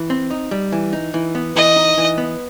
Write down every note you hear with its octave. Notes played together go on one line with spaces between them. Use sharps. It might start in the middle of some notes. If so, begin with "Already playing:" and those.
Already playing: E3
C4
D#4
G3
E3
D#4
E3
B3
E3 D#5
D#4
E3
B3